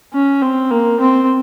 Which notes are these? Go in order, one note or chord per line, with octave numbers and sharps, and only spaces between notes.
C#4
C4
A#3
C4